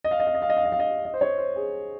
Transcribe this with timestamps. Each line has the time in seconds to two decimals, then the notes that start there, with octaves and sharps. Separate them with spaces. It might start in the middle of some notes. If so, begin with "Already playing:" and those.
0.04 D#5
0.11 F5
0.20 D#5
0.27 F5
0.34 D#5
0.42 F5
0.50 D#5
0.57 F5
0.65 D#5
0.72 F5
0.80 D#5
1.05 D#5
1.14 C5
1.21 C#5
1.38 C5
1.56 G#4